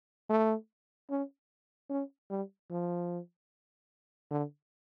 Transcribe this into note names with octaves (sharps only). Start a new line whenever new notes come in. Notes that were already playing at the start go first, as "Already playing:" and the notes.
A3
C#4
C#4
G3
F3
D3